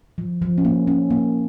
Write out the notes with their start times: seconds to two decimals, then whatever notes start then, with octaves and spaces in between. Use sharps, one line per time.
0.18 F3
0.42 F3
0.58 C#4
0.65 A#3
0.87 C#4
1.10 A#3